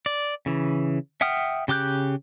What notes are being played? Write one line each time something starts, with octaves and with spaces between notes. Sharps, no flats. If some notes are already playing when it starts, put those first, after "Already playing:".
D5
C#3 E3
E5 F#5 G5 D#6 F6
C#3 G4 D6 F#6 G6